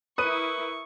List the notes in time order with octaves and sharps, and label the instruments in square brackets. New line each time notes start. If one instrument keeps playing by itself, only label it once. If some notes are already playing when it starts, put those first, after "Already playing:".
[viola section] E4 A#4 [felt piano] B4 [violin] C#6 [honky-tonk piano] D#6 D#7